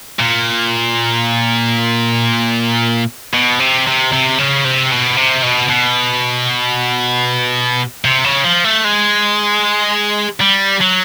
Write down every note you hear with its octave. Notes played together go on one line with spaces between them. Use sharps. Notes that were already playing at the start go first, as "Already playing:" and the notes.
A#2
B2
C3
C3
C3
C#3
C3
B2
C3
B2
B2
C3
C#3
F3
A3
G#3
G3
F#3